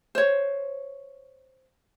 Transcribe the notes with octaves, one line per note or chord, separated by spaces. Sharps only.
C5 C#5